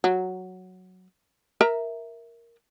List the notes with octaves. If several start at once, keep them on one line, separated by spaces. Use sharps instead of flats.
F#3
A#4 E5 A#5